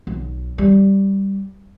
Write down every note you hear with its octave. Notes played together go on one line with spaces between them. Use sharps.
B1
G3